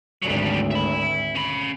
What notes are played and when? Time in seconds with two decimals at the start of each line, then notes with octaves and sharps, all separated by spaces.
0.22 G#1 D2 F#3 G3
0.71 E5 B5
1.35 C#4 B5